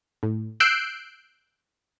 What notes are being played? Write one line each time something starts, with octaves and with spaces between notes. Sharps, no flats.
A2
E6 F#6 G6 C7 D7